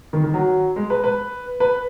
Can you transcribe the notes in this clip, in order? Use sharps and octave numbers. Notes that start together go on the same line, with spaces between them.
D#3
D#3
F#3
G#3
B4
B4
B4